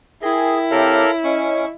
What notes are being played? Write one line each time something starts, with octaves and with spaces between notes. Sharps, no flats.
E4 G#4 A#4 G5
C3 G4 A4 A#4 C#5 F5
C#4 D#5 C#6